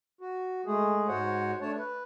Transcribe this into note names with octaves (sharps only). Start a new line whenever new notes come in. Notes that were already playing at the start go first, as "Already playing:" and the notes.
F#4
G#3 A3 G#4
G#2 F#4 C5 C#5 F#5
A3 D4 C#5 A5
B4